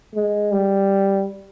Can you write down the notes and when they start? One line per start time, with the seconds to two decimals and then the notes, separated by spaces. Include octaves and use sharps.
0.14 G#3
0.52 G3